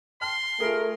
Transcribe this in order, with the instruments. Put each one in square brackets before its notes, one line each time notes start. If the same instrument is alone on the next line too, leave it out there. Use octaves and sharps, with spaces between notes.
[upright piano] G5 A5 F6 [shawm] C6
[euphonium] A3 [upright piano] F4 G#4 [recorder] A#4